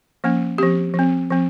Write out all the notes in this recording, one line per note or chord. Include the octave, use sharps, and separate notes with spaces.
F3 A#3 C#4
F3 C4 G4
F3 C4
F3 C4